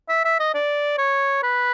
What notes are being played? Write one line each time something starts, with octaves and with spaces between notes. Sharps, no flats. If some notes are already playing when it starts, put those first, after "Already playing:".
E5
E5
D#5
D5
C#5
B4